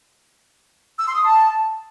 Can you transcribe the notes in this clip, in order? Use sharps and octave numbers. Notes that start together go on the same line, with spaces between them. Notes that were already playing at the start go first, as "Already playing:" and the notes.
E6
C6
D#6
A5